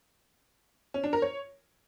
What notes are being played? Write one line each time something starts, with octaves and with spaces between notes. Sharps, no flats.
C#4
D4
A#4
C#5